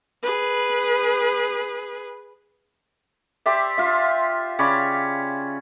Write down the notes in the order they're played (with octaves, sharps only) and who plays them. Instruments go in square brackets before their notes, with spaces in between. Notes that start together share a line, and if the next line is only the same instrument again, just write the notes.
[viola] G#4 B4
[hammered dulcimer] G4 C5 D5 E5
F4 E5
C#3 C#5 D5 B5